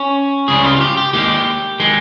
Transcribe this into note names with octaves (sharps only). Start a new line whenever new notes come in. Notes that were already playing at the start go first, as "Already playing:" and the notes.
Already playing: C#4
C#2 C#3 G3 G#4
F4
F4
G4
G4
D#2 D#3 G#3 G4
D#3 G#3